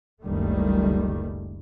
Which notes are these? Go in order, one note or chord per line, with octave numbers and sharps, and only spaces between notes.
F#1 C#2 D#3 G3 A3